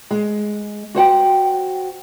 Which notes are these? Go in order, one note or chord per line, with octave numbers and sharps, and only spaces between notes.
G#3
F#4 C5 F#5 G5